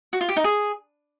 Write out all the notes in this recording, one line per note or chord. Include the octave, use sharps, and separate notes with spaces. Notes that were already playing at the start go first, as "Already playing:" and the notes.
F#4
F4
G4
D#4
G#4